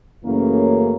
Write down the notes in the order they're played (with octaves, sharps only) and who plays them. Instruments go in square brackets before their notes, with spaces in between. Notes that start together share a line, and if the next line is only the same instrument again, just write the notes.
[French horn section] F#2 C#3 E3 A3 A#3 C#4